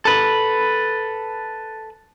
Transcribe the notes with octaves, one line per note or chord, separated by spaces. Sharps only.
A4 B4